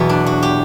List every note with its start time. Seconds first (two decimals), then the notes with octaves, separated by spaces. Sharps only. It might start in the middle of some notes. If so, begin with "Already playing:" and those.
Already playing: E2 B2 F#3 B3
0.09 D4
0.26 F#4
0.43 G4